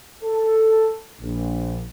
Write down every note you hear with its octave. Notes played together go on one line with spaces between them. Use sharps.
A4
A#1